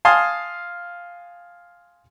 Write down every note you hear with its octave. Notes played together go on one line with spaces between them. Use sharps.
F5 G#5 A5 C6 D#6